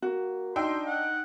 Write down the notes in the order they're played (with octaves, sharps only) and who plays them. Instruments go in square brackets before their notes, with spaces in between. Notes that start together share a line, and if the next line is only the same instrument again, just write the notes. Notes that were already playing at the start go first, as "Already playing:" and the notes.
[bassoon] A#3 [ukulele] F#4
[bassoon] D4 [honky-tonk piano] D#4 G5 E6 [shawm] C6
[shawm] F#5